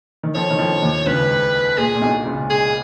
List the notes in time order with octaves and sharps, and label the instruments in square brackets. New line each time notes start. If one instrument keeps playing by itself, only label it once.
[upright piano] D#3
[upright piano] F2 F3 [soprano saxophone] C#5
[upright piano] D#3
F2 F3
D#2 D#3
[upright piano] C#2 C#3 [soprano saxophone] B4
[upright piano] A#2 [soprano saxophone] G#4
[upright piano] A#2
B1 B2
C#2 C#3
[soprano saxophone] G#4